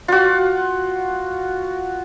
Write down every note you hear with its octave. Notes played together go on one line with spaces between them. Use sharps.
F4 F#4